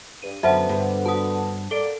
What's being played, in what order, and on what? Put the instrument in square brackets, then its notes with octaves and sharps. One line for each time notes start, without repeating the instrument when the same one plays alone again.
[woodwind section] G2 [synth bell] D#7
[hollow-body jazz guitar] F#2 [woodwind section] D3 B3 [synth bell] F#4 C5 F#5 [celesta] E5 A5
[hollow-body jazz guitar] G2
[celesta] F#4 D#6 [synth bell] F#5 A5
[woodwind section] A#3 D5 [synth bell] A4 [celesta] D7 G7